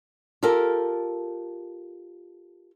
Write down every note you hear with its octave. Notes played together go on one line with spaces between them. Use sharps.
F4 G4 A4 A#4